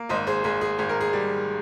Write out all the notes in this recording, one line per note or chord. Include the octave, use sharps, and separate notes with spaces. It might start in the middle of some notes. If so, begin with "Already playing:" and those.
Already playing: A#3
G#1 C5 D#5
G#4 C5
G#1 G#4
G#4
G#1 G#4
A#4
G#4
G3